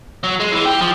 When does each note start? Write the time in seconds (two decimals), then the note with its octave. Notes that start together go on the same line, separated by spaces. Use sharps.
0.24 F#3
0.40 G#3
0.52 E3
0.66 G4
0.81 F3